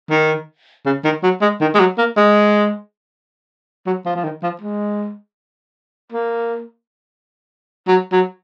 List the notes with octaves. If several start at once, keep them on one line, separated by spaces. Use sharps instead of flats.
D#3
C#3
D#3
F#3
G#3
D#3
G#3
F#3
A#3
G#3
F#3
F3
F3
D#3
F3
G#3
A#3
F#3
F#3